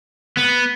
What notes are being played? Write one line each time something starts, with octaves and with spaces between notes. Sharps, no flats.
B3